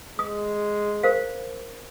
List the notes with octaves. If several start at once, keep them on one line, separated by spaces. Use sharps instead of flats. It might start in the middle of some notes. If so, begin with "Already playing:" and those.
G#3 D#6
A#4 C5 F5